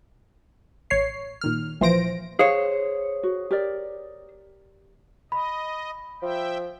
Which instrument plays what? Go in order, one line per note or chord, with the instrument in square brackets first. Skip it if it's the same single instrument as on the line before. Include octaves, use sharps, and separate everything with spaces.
[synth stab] A1 C#5 C7
A#2 D#3 F6
A#1 E3 F3 C5 A#6 D7
[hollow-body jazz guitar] G#4 C5 C#5 [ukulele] F5
[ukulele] F#4
G4 A#4 D5
[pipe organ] D#5 [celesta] B5
[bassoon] F3 [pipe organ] E5 G5